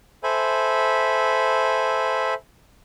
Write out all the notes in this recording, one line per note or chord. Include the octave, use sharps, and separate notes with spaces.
A4 C5 E5 G#5 B5